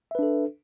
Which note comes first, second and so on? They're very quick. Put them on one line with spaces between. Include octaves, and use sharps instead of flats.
E5 B4 D4 A4